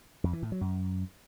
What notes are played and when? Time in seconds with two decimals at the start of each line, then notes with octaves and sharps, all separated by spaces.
0.24 F2
0.33 E3
0.42 A2
0.52 F#3
0.61 F#2